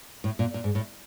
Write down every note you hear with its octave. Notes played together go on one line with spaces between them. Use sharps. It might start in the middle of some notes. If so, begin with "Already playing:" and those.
A2
A#2
A#2
G#2
A2